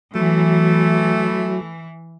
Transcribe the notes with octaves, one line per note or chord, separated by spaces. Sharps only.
E3 F#3 A3